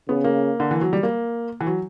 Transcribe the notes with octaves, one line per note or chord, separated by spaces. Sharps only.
C#3 B3
A#3
D3
E3
F#3
G3
A#3
E3
F#3